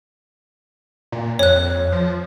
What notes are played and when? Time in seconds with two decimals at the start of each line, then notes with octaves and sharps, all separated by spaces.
1.12 A#2
1.39 F2 C#5 F#6
1.92 F3